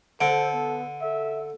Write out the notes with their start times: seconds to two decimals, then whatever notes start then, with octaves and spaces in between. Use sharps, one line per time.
0.21 D3 A4 C5
0.52 B3
1.02 A4 E5